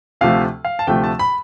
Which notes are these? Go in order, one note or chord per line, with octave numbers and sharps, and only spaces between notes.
D2 C3 F3 A3 F5
F5
A5
D2 C3 F3 A3 G5
A5
B5